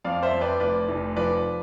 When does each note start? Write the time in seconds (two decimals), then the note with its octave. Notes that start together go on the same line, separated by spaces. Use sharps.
0.04 F2 D5 F5
0.23 C5 E5
0.32 F2
0.41 B4 D5
0.60 F1 B4 D5
0.88 F1
1.16 F3 B4 D5